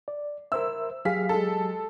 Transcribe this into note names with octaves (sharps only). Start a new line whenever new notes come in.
D5
A#4 C5 E5 E6
F#3 G4 G#4 F5 B6
G#3 A4